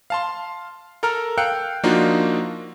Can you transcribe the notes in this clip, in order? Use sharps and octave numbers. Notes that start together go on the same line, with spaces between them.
F5 A5 C6
A4 A#4 A#5 F6
F5 G5 E6 F#6 C#7
F3 A#3 D4 D#4 F4 F#4